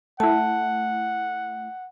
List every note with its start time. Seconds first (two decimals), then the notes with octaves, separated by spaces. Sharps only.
0.20 A3 E4 F#5 A5